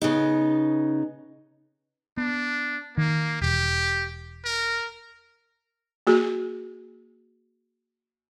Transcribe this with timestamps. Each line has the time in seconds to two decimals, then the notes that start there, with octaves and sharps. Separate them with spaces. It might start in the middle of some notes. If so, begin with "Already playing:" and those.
0.02 C#3 B3 D#4
2.17 B3 D4
2.98 D#3 A#3
3.42 E1 G4
4.45 A#4
6.07 A#3 F#4 G#4